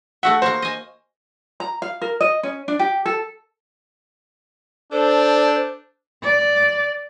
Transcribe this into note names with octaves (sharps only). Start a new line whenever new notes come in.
A3 F#4 E5 F#5
A#3 F#4 C5
D#5 G#5
A#5
F5
A#4
D#5
C#4
D4
G4
A4
D4 A4 C5 D5
D5